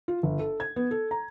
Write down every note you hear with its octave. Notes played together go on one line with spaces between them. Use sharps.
F4
G1
A4
G#6
B3
A4
A#5